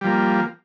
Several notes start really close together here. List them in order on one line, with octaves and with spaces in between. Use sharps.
G3 F3 A#3